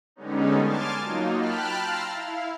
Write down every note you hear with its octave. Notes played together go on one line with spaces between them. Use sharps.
D3 G3 G#3 B3 C#4 D#4
G#5 A5 C6 D6 F6 A6
F#3 A#3 D#4 F4
G5 A5 B5 F6 F#6
F5 A5 A#5 C6 E6 F6
E4 F5